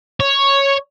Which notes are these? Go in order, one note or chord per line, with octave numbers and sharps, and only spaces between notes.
C#5